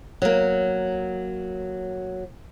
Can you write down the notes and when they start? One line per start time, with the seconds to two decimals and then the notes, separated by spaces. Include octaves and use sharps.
0.22 F#3 A#3